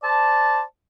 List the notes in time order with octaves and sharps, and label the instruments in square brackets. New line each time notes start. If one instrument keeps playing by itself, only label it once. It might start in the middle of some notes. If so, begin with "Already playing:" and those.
[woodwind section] C5 D5 A5